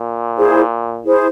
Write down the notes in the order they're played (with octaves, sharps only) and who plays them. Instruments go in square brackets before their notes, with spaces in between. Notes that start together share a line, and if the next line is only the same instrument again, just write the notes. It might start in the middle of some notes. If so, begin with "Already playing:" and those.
Already playing: [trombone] A#2
[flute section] E4 G#4 C5
E4 G#4 C5